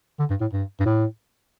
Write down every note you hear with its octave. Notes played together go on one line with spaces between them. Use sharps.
D3
G2
A2
G2
G2
A2